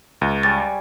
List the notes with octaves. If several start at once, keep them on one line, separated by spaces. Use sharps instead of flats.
C#2
G3 C#5 G#5 A6